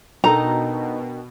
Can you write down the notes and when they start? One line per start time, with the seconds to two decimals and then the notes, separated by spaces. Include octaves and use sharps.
0.24 B2 D4 D#4 A4 A#4 D#5 G5 A#5